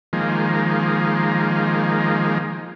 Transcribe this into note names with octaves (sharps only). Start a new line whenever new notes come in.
D#3 F3 G#3 A#3